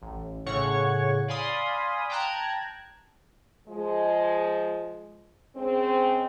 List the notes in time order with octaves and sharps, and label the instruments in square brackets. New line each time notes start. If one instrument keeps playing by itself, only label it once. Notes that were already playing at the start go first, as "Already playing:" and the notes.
[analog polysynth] A1
A2 C#3 C#5 F#5 C#6
D5 F5 G#5 B5 C6 D#6
G5 A5 A#5 F#6 G#6
[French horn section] F3 G#3
C#3 G#3 C4